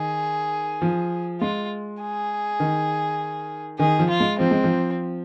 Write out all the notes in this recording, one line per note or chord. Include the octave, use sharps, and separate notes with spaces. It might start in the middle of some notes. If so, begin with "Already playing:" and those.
Already playing: D#3 G#4
F3
G#3 F4
G#4
D#3
D#3 G#4
F3
F4
G#3
F3 C4
G#3
F3